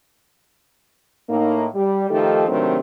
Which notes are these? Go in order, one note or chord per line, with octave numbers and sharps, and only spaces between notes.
A2 A#3 D#4
G3
D#3 F3 A3 D#4 G4 A4
C3 D#3 F#3 A3 C4 D4